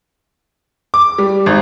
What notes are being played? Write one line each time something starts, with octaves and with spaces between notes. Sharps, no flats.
D6
G3
G#1